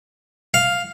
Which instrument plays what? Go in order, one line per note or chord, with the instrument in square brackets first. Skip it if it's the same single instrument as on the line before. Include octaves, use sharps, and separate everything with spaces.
[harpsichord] F5